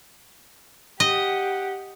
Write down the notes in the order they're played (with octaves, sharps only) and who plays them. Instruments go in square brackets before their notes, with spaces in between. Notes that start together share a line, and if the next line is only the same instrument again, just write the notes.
[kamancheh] G4 F#5 [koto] D#5